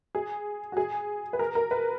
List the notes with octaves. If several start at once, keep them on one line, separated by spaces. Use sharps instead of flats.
G#4
F#4
G#4
B4
A#4
A#4
B4